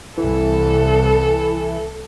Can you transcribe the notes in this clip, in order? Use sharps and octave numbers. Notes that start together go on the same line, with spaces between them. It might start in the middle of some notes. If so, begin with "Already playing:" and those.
C2 E3 A4